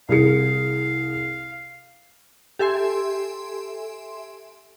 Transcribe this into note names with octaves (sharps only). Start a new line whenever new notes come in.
C2 G#4 F5 C#7
G4 A4 E5 G#5 C6